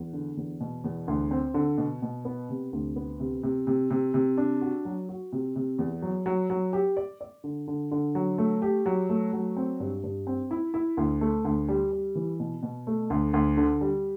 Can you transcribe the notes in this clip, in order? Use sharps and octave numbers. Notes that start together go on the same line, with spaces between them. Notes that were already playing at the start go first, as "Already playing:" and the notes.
Already playing: E2
D3
E2
B2
E2
D2
C4
D3
B2
B2
B3
C3
D2
B3
C3
C3
C3
C3
C3
D4
F#4
F#3
F#4
C3
C3
E2
F#3
F#3
F#3
G4
D5
D5
D3
D3
D3
F#3
A3
G4
F#3
A3
F#3
C4
G2
G2
C4
E4
E4
D2
A3
D2
G3
G3
E3
B2
B2
A3
D2
D2
D3
G3